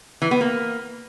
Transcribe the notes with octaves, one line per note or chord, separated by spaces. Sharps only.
E3
B3
A#3